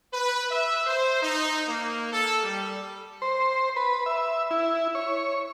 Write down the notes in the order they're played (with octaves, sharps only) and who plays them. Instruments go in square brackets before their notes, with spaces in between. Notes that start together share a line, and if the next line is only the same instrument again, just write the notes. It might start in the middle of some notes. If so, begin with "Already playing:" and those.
[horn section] B4
E5
C5
D#4
A#3
A4
G3
[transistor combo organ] C5
B4
E5
E4
C#5